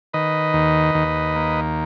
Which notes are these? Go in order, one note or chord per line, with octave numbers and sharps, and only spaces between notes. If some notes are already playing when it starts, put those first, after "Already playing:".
D#3 B4 D#5
D#2
D#2
A#3